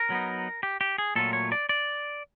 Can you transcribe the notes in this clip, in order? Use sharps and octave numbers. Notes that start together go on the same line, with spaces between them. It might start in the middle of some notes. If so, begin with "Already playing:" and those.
Already playing: A#4
F#3 B3 D#4
G4
G4
G#4
A#2 F#3 A3 C#4 F4 A4
C#5
D5
D5